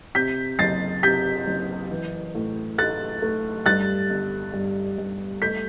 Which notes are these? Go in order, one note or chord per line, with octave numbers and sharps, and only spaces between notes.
C3 G6 B6
F#1 A6 C7
C3 G6 B6
F#1
E3
A2
A3 F#6 A6
A3
G2 F#6 A6
G1
G2
G2
A3 G6 B6